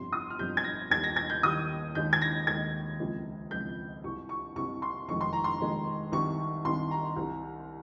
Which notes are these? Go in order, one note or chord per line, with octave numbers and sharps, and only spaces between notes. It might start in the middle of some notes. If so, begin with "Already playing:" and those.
Already playing: G1 F2 C3 G3 C6
D#6
F6
G1 F2 C3 G3 G6
G#6
A#6
D#2 D#3 G3 G#6
A#6
G#6
G6
D#2 D#3 G3 D#6
D#2 D#3 G#3 G6
G#6
A#6
D#2 D#3 G#3 G#6
C#2 C3 F3 G#3
C#2 C3 F3 G#3 G6
C2 C3 G3 C#6
C#6
C2 C3 G3 C#6
C6
F1 F2 D#3 G#3 C#6
C6
A#5
C6
F1 F2 D#3 G#3
C2 C3 D#3 G3 C#6
C2 C3 D#3 G3 C6
A#5
C2 C3 G3